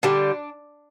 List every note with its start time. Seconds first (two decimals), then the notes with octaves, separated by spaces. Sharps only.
0.03 D3 G3 D4